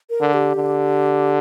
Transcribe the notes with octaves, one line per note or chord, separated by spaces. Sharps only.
A#4
D3
G4
D3